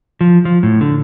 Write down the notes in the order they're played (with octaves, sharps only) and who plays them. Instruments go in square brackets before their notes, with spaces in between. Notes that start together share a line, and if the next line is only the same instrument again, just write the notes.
[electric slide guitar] F3
F3
A2
D3